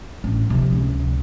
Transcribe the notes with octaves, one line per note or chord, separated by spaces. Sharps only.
A1
C3 F3
C#2